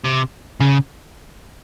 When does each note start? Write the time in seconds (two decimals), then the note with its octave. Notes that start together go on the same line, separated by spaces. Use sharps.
0.05 C3
0.60 C#3